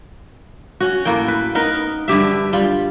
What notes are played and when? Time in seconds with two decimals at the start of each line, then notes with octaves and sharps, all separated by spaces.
0.80 C#4 F#4
1.05 A2 A#3 A4 G5
1.28 B4
1.55 B3 D#4 A#4 B4
2.08 G2 D3 G4 E5
2.53 G3 F4